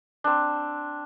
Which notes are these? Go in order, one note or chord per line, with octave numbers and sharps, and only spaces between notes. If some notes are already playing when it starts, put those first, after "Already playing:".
C4 D4